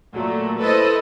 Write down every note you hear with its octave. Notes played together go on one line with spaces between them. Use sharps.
A#2 F#3 A3
E4 A4 B4 C5 D#5